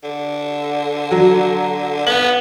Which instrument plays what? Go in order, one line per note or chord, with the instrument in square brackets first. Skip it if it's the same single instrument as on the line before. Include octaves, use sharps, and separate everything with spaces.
[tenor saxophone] D3
[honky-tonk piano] F#3
[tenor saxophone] B3 [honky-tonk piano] F#7